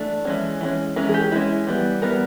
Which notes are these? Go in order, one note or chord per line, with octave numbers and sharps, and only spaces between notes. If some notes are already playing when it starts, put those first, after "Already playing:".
Already playing: E3 A3 D4
E3 G#3 C#4
E3 G#3 C#4
E3 G#3 C#4 A#4
G#4
G4
E3 G#3 C#4 E4
E3 G3 B3
E3 G3 B3 A#4